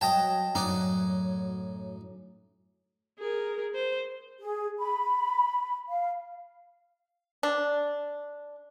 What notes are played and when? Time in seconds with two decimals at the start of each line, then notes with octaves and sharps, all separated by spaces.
0.01 F#3 D#5 G5 A5
0.55 F#2 A2 F#3 D#4 D5
3.19 G#4 A#4
3.74 C5
4.41 G#4
4.79 B5
5.88 F5
7.43 D4